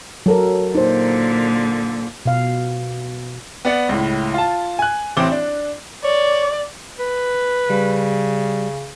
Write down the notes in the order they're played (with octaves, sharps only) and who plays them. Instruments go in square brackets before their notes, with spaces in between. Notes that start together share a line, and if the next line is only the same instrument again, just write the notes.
[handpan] F#3 A4 A#4
[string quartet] A#2 D3 [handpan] D#4 C5
[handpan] B2 F5
[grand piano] B3 D5 F#5
C#2 A2
F4 A5
G#5 F#6
A1 C4 D6 G7
D4
[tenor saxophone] C#5 [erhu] D5
[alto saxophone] B4
[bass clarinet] C#3 [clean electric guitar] G3